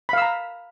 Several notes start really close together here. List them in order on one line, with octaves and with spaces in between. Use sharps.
B5 F5 E6 A#5